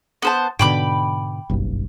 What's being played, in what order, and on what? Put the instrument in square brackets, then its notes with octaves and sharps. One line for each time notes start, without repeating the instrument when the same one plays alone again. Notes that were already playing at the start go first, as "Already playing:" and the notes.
[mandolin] B3 C5 A5
[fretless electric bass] G#2 B2 D3 [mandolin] G5 B5 D6
[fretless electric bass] F#1 B1 G2